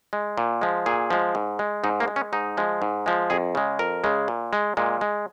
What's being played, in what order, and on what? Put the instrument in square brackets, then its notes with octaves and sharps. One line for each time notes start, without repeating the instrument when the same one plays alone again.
[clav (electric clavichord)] G#3
A#2
F3 G#3
A#2 G#4
F3 G#3
G#2
G#3
G#2 D#4
A#3
G#3
C#4
G#2 D#4
F3 G#3
G#2
F3 G#3
F2 G#4
C#3 G#3
F2 A#4
C#3 G#3
A#2
G#3
A#2 G#3
G#3